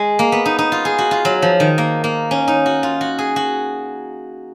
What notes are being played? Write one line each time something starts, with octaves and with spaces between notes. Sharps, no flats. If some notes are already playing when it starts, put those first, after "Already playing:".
Already playing: G#3
A#3
B3
D#4
D#4
F4
G#4
F#4
F4
F#3
F3
D#3
A#3
A#3
C#4
D#4
F#4
F4
F#4
G#4
F#4